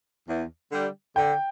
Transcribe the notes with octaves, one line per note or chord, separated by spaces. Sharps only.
E2
D3 G3
D3 G5